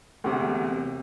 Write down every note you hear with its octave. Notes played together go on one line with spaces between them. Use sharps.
E1 D2 C3